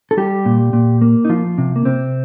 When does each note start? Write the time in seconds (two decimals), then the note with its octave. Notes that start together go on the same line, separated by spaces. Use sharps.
0.11 A4
0.17 G3 G4
0.46 A#2
0.73 A#2
1.01 A#3
1.25 D#4
1.29 F3 F4
1.58 C3
1.76 A#3
1.85 C3 C4